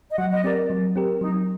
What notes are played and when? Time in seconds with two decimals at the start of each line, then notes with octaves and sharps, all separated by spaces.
0.11 D#5
0.18 F#3 F#5
0.32 D#5
0.44 C4 G4 A#4 D5
0.70 F#3
0.96 C4 G4 A#4
1.21 F#3 D#4